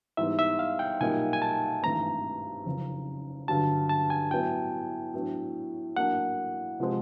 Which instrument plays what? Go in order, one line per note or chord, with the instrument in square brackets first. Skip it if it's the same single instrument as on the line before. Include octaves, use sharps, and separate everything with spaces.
[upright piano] G#2 E3 G3 B3 [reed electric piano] E5
[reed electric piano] E5
F5
G5
[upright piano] B1 A#2 G3 A#3 D#4 [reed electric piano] G#5
[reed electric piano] G#5
A5
[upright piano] G#1 G2 E3 A3 C4 [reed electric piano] A#5
[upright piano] F#1 F2 C#3
[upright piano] G1 G2 D3 F#3 [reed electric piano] A5
[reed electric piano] A5
G#5
[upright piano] A2 F#3 B3 E4 [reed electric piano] G5
[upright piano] A2 F#3 B3 D4
[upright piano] A2 F#3 A#3 D4 [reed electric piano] F#5
[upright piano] C3 F3 G#3 C4